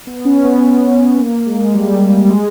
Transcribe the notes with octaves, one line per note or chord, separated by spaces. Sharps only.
B3
C#4
B3
A#3
G#3
G3
G3
G#3